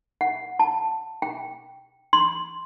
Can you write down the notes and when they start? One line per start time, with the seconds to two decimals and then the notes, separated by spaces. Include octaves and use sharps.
0.21 F#5
0.59 A5
1.22 G5
2.13 C6